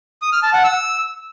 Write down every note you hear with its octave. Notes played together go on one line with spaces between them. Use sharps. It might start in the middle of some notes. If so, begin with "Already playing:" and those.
D#6
F6
A5
F#5
E6